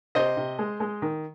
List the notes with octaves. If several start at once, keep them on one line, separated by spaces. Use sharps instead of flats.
C3 C5 D#5
C3
G#3
G#3
D#3